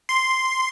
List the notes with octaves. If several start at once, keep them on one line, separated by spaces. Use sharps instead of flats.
C6